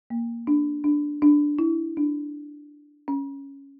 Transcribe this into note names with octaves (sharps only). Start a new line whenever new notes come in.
A#3
D4
D4
D4
E4
D4
C#4